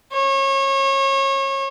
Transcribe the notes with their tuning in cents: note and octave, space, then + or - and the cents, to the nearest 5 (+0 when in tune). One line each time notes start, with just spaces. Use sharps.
C#5 -30